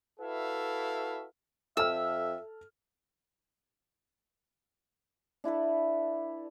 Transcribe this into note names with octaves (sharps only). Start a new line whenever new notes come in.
E4 F#4 A4 B4 E5 F5
F2 A4 E5 E6 F6
D4 E4 A4 B4